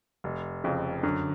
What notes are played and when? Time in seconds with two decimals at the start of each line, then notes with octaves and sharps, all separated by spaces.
0.24 F1
0.64 F2 C#3
1.03 F#2 D3